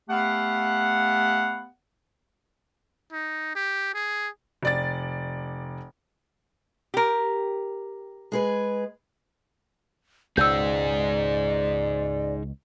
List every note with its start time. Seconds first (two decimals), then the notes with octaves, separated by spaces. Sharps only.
0.10 A3 B3 G4 F5 F#5
3.12 D#4
3.56 G4
3.94 G#4
4.63 F1 D5 A6
6.94 G4 A#4
8.32 G#3 G#4 B4
10.37 C#2 B2 D#4 G#4 C5 D5 E6 G6